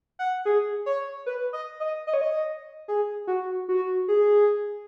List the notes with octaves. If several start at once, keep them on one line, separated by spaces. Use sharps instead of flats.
F#5
G#4
C#5
B4
D#5
D#5
D#5
C#5
D#5
G#4
F#4
F#4
G#4